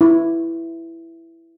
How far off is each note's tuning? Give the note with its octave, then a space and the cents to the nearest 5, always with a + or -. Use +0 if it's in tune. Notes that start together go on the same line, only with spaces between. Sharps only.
E4 +5